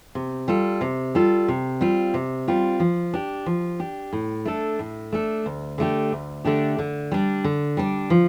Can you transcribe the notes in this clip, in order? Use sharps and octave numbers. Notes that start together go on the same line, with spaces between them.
C3
G3 F4 A4
C3
G3 F4 A4
C3
G3 C4 F4
C3
G3 C4 F4
F3
D4 G4
F3
D4 G4
A2
A3 D4 A4
A2
A3 D4 A4
D2
D3 A3 D4 G4
D2
D3 A3 D4 G4
D3
G3 D4
D3
G3 D4
F3